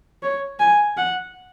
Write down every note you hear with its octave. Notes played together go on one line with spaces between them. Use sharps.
C#5
G#5
F#5